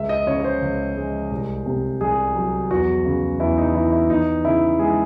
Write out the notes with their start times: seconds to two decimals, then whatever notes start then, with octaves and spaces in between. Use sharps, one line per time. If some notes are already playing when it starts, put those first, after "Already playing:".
Already playing: C#2 E5
0.09 D#5
0.26 C#3 C#5
0.40 C#5
0.44 C5
0.62 C#2
0.97 G#3
1.32 C2
1.66 C3
2.01 C2 G#4
2.36 F#3
2.71 E2 F#4
3.05 C#3
3.40 E2 E4
3.58 D#4
3.75 E3 E4
3.92 E4
4.10 E2 D#4
4.45 C#3 E4
4.79 G#3 G#4